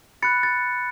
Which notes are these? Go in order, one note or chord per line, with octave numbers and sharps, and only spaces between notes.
B5 F#6 A6 C#7
A6